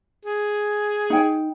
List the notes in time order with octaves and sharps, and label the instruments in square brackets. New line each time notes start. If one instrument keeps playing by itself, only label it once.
[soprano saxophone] G#4
[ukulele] D#4 G5